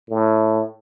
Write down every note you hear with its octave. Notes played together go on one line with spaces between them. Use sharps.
A2